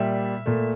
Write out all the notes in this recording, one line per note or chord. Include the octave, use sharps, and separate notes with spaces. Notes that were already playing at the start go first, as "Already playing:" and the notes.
Already playing: A#2 G3 E5
A#2 A3